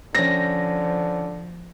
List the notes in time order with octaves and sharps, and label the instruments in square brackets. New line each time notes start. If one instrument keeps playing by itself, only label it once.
[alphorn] D3 [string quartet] F3 [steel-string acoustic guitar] C4 C#4 [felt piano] A#6